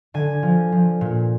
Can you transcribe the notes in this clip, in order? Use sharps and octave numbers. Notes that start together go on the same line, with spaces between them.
D3 G#5
F3
F3
A#2